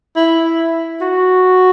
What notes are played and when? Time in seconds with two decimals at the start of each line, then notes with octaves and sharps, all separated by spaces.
0.16 E4
1.01 F#4